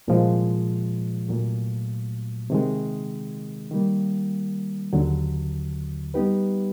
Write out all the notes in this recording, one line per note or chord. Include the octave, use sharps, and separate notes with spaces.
C2 A#2 F3 G#3
C2 A#2 F#3 A3
C3 D#3 G#3
D#3 G3 A#3
D#2 D3 F#3
G3 B3 D#4 G4 B4